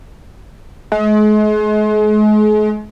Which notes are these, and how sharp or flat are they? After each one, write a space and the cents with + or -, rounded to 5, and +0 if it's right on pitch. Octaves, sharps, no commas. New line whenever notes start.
G#3 +40